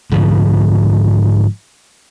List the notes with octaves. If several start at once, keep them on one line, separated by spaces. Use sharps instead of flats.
G#2 D3 F3